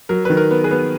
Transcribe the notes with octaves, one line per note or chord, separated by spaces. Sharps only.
F#3 A#4
D#3 B4
A#4
B3
G#4 B4
B3